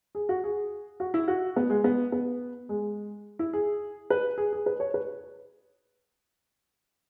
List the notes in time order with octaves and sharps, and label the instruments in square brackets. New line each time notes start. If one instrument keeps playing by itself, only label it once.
[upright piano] G#4
F#4
G#4
F#4
E4
F#4
B3
G#3
B3
B3
G#3
E4
G#4
B4
G#4
G#4
B4
C#5
B4